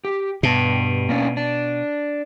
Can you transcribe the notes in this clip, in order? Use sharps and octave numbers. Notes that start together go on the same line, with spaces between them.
G4
G2 B2 A5
A#3 C#4 D4
D4